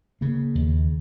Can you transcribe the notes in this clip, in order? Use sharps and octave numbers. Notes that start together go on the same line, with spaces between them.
C#3 A#3
D#2